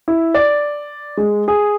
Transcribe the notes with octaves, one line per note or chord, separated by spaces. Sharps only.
E4
D5
G#3
G#4